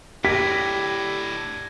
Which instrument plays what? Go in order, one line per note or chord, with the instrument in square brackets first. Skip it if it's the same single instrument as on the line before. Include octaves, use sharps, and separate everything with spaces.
[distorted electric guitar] A2 D3 [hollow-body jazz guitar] G4 [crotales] G#6 A#6 [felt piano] B6